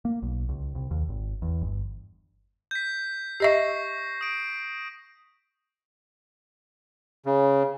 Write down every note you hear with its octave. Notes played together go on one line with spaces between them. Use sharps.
A#3
B1
C#2
C2
D#2
G#1
E2
G1
G6 B6
G4 D#5 E5 C#6 A#6 C7
D#6 D7
C#3